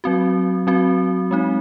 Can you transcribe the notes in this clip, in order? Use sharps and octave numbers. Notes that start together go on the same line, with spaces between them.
F#3 C4 F#4
F#3 C4 F#4
G#3 C4 D#4